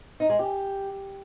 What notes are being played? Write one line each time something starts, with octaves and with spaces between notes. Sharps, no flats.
D#4
G#3
G4